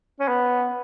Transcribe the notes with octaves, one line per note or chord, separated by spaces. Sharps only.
C#4
B3